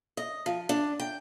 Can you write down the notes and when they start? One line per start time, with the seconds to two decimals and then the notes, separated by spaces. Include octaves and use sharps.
0.17 D#5
0.46 F3
0.69 D4
1.00 G5